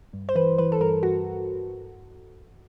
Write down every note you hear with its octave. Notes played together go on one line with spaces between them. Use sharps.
G2
C5
E3 B4
E3 B4
A4
G2 A#4
G2 F#4